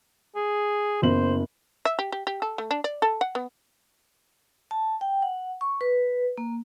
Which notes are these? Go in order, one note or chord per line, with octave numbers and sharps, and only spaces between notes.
G#4
F#1 B3 C5 F#7
E5
G4
G4
G4
A4
A3
D4
D5
A4
F#5
B3
A5
G5
F#5
C#6
B4
A#3